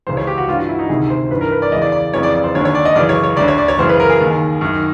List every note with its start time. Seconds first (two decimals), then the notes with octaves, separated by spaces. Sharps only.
0.07 C#2 C#3 E3 C5
0.17 C#5
0.27 G4
0.38 F#4
0.48 G2 E3 F4
0.59 F#4
0.69 E4
0.79 D#4
0.89 D2 C3 D#3 G#4
1.10 C5
1.30 G2 E3 B4
1.41 A#4
1.52 B4
1.62 D5
1.72 E2 C#3 E3 D#5
1.82 D5
1.92 D5
2.13 F2 C#3 E3 C#5
2.23 D5
2.34 D5
2.44 C5
2.55 D#2 D3 C#5
2.65 C#5
2.75 D5
2.85 D#5
2.95 F#2 C#3 E3 D5
3.09 C#5
3.24 C#5
3.37 D2 D3 D5
3.48 C#5
3.58 D5
3.68 C#5
3.78 F#2 C#3 E3 C5
3.89 B4
4.00 A#4
4.10 G#4
4.20 D#2 D#3
4.61 F#2 D#3